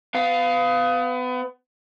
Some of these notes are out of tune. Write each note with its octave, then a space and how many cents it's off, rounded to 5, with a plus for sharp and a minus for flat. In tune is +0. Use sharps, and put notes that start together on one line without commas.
B3 +30 F5 +0